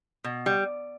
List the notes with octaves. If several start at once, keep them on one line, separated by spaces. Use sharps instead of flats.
B2
G3